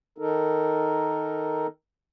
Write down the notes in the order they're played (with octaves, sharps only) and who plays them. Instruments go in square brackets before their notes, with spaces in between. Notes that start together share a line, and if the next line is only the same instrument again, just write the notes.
[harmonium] D#3 D#4 A4 A#4